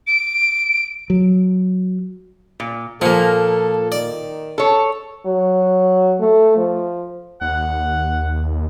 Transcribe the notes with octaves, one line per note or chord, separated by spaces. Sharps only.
D7
F#3
A#2
A#2 F3 A#3 A4
D#3 D5
A4 C#5
F#3
A3
F3
D#2 F#5